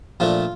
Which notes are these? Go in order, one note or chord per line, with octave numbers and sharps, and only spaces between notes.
A#2 F3 A3 D4 F4